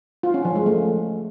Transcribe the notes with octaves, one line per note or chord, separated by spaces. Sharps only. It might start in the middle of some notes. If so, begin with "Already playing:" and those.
F4
C#4
F3
G#3
A3